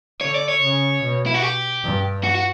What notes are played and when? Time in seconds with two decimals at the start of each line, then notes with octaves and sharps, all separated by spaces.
0.21 D3 C#5
0.35 D5
0.48 C#5
0.62 C#3
1.03 B2
1.26 E4
1.34 F#4
1.42 G4
1.83 G2
2.24 F#4
2.35 F#4